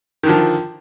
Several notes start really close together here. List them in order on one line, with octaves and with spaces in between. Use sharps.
D#3 D3 F3